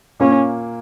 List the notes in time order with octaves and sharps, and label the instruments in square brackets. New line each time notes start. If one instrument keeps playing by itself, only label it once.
[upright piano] A#2 A#3 [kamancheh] C#4